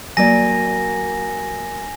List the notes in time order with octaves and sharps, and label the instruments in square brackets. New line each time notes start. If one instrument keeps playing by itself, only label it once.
[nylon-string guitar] F#3 A#3 D5 [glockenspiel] G#5 A#6